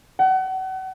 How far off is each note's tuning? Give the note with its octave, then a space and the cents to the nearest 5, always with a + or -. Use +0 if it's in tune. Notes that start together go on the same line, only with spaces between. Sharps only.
F#5 +35